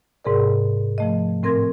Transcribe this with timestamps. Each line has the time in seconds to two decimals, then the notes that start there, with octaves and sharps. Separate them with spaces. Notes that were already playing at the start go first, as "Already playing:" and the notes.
0.25 G#2 C3 G#4 A#4 D5
0.98 F3 A3 D#5
1.43 A2 C4 A#4 C6 G#6 A#6